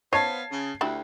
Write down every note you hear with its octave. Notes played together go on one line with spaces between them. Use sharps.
B3 C5 C#5 F5 A5 G#6 C7
C#3
D2 D4 E4 G4